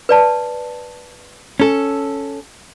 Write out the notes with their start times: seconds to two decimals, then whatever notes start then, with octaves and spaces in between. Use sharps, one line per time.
0.09 B4 D5 A5
1.60 C#4 A4